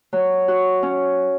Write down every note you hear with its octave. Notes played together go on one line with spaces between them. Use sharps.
F#3
F#4
C#4